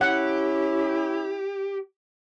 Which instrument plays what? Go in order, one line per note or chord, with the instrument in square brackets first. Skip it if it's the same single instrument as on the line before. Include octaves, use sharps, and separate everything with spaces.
[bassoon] C#4 [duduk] E4 [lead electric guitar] G4 [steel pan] F#5